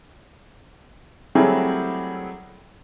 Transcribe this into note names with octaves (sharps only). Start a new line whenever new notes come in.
F#3 G3 A3 C4 E4 G#4